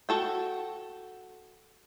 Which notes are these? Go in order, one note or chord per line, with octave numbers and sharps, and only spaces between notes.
F#4 A4 G5